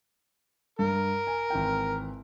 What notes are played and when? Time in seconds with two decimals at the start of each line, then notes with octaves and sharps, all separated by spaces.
0.79 G2 A#4
1.27 G#5
1.50 G#1 E3 G5